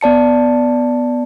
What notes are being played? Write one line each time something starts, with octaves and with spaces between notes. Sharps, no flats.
B3 D5 A5 C#7